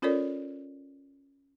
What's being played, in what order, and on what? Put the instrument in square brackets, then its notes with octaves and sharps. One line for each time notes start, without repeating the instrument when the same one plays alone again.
[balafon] C#4 F4 A4 A#4 C#5 D5